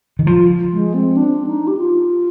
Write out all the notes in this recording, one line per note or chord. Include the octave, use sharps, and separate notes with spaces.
D#3
F3 F4
G#3
C4
D4
D#4
G4
F4